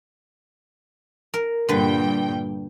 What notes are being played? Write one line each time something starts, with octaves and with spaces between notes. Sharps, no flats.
A#4
G2 A#2 D3 B4 G5